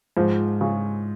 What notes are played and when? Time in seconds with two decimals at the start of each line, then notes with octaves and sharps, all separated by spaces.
0.17 G#2 F3
0.61 C#3